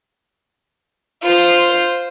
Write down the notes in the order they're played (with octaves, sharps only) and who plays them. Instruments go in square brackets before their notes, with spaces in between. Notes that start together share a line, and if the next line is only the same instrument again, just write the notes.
[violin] F4 C5